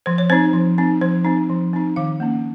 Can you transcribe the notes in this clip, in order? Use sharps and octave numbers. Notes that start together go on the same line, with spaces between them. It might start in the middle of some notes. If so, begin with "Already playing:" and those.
F3 C5
C#5
C4 D#4 C5
F3
C4 D#4
F3 C5
C4 D#4
F3
C4 D#4
D#3 F5
A#3 C#4